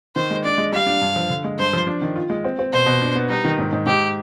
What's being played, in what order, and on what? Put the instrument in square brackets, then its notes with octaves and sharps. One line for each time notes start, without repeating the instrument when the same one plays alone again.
[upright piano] D#3 [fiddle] C5
[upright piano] G#3
[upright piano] D4 [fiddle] D5
[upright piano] G#3
[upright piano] G3 [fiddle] F5
[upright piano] D4
G2
F3
D3
G#3
[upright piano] G2 [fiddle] C5
[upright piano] F3
D4
D#3
F4
G#3
C4
C4
[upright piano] B2 [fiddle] C5
[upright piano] B2
D4
B3
[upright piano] G3 [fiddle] D#4
[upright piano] D#3
G#2
G#2
[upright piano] G#2 [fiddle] G4